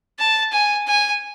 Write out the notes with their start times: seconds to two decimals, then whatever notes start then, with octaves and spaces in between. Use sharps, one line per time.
0.19 A5
0.52 G#5
0.87 G#5